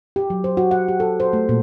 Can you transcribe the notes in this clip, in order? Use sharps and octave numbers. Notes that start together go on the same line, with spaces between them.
G4
F#3
C5
F#4
F#5
G4
A4
C5
A3
A#2